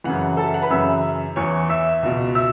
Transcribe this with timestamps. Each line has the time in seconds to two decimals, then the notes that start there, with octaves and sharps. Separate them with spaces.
0.04 F#2 C#3 E3 F#5
0.37 A4 A5
0.46 E5
0.54 F#5
0.62 B4 B5
0.70 F#2 C#3 E3 E5 E6
1.36 E2 E3 C#5 C#6
1.69 E5 E6
2.03 C#2 B2
2.35 E5 E6